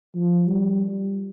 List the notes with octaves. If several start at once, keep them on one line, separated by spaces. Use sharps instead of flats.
F3
G3